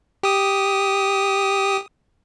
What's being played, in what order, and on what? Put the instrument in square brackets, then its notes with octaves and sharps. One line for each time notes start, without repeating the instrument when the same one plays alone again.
[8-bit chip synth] G4 D#6